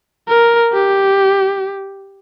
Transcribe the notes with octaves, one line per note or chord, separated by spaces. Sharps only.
A#4
G4